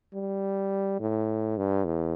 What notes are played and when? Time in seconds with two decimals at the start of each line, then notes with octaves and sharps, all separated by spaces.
0.14 G3
1.00 A2
1.58 G2
1.85 E2